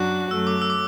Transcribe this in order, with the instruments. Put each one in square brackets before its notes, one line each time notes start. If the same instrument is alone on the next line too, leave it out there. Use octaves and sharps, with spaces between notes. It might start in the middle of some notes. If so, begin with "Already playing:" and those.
Already playing: [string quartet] F#2 F#3 D4 F#4 [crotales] F#6
[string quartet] F#2 F#3 A3 [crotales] E6
[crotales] D6
E6
D6